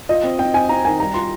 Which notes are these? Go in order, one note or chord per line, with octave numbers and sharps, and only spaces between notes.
F4 D#5
C4
C4 G5
C4 G#5
C4 A#5
D#3 G#5
G3 A#5
F4 C6